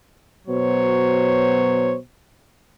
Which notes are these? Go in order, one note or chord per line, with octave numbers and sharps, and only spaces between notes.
B2 F#3 C5 C#5